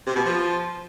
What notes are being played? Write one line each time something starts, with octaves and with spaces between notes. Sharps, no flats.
C3
B2
F3